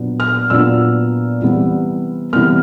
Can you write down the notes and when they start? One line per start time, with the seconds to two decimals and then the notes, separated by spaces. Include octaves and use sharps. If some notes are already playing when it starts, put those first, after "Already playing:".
Already playing: A#2 F#3 B3 D4
0.20 F6
0.50 A#2 F#3 B3 D4 E6
1.42 C3 E3 G3 B3
2.33 C3 E3 G3 B3 F6